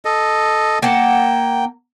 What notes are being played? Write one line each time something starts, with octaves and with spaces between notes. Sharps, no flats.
A4 D#5
A#3 F#5 G5 A5